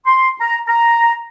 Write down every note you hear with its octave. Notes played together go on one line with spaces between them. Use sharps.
C6
A#5
A#5